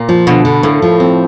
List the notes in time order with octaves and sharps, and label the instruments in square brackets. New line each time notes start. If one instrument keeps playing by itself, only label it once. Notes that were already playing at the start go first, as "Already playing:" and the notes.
Already playing: [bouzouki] A#2 [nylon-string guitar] A#3
[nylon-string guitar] F3
[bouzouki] B2 [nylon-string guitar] D3
[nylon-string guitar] D3
[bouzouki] A2 [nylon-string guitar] A#3
[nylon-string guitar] F3
C4